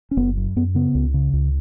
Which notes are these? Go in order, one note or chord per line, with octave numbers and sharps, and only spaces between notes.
C#4
F#1 B3
F#2
F#2 B3
C#3 B3
C#2
C#3
C#2